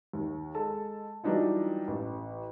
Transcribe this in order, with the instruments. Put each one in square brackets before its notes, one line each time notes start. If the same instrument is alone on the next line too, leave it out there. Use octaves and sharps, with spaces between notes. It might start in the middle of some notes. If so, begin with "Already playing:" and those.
[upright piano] D#2
G#3 A4 A5
E3 F#3 G3 D4 D#4 F4
A1